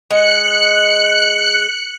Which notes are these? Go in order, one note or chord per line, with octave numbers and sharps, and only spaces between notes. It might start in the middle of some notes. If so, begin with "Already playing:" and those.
G#3 F#6 C#7